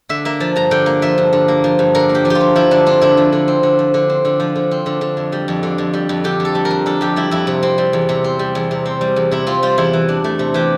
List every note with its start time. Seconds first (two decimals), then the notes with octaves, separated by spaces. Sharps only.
0.09 D3 E5
0.25 A#3 E5
0.40 F3 A5
0.56 G2 A#5
0.71 D3 G5
0.86 A#3
1.02 F3 E5
1.18 G2
1.33 D3
1.48 A#3
1.64 F3
1.79 G2
1.95 D3 A#4
2.09 A#3
2.15 G4
2.25 F3
2.30 F4 G4
2.41 G2
2.56 F3 E4
2.71 D3 D4
2.86 C4 D4
3.01 D3 E4
3.17 F3
3.32 D3
3.48 C4
3.63 D3
3.79 F3
3.94 D3
4.10 C4
4.25 D3
4.40 F3
4.56 D3
4.71 C4
4.86 D3
5.01 D3
5.17 F2
5.32 G3
5.48 F2
5.63 D3
5.78 F2
5.94 G3
6.09 F2
6.24 D3 G4
6.40 F2
6.45 A4
6.55 G3
6.65 A#4
6.70 F2
6.86 D3 A4
7.01 F2 G4
7.16 G3 E4
7.31 F2 E4
7.47 C3
7.63 C4
7.78 G3
7.93 E2
8.09 C3
8.24 C4
8.39 G3
8.55 E2
8.71 C3
8.86 C4
9.01 G3
9.16 E2
9.31 C3 E4
9.47 C4 F4
9.62 G3 F4
9.78 E2 E4
9.93 E3
10.09 D4
10.24 A3
10.39 C3
10.54 E3 G4